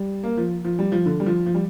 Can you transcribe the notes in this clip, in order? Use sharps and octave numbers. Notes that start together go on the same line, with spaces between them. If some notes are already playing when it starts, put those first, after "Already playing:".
Already playing: G3
A#3
F3
F3
G3
F3
D3
G3
F3
F3
G3